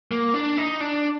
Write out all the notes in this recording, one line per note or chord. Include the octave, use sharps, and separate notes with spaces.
A#3
D4
D#4
D4